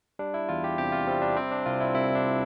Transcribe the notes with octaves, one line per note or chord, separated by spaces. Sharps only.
G3 D4
E4
E2 F4
G4
C3 G4
F4
G3 C4
D4
C3 C4
D4
C2 F4
E4
C2 E4
D4